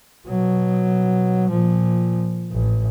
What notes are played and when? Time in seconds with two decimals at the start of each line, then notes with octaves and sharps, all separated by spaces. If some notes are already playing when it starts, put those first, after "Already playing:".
0.27 B2 F#3
1.50 A#2 F3
2.52 A1